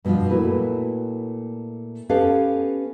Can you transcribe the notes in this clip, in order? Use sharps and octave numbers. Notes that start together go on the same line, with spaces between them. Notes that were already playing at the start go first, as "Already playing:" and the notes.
G2 B2 D#3 F3 F4
A#2 A3 E4 F#4 B4
B3 C#4 G4 A4 B4 F5